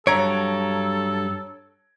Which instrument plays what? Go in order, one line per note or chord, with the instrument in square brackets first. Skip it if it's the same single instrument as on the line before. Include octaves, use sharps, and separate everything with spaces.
[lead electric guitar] G2 F#3 [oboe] A4 [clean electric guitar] C#5 [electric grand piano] A#5 G#6 D7